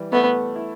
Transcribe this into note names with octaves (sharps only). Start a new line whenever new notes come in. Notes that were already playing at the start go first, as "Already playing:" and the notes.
Already playing: E3 G3
A3 B3
E4